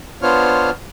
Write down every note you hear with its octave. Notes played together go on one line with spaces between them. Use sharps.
B3 D4 F4 C5 C#5 F6